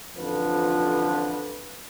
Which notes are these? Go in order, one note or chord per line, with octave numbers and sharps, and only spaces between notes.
A1 F2 D3 F3 B4